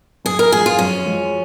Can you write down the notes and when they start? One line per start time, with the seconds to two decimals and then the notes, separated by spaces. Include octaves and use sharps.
0.25 F#2 G#4
0.39 A#4
0.52 F3 G#3 G#4
0.66 F4
0.79 F#2 C#4
1.06 F3 G#3